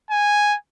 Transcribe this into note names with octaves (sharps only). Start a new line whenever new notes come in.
G#5